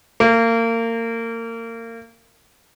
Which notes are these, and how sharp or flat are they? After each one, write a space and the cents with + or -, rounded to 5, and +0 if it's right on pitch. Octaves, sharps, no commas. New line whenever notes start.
A#3 -30